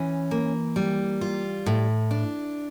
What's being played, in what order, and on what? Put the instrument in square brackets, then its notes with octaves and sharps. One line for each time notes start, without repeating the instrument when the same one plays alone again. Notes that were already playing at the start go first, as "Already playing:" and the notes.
Already playing: [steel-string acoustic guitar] E3 C#4
A#3
G3
F4
A2
D4